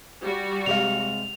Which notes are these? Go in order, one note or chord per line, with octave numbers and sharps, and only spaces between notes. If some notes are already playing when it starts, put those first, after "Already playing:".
G3 F#4
C3 G#3 F5 F7